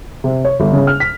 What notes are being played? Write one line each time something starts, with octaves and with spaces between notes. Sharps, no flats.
C3
C#5
G1
C#3
F6
B6